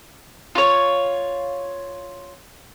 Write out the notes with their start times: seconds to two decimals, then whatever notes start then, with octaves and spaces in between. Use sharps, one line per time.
0.55 F4 C#5